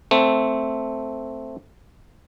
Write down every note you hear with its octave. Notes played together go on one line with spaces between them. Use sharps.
A3 C4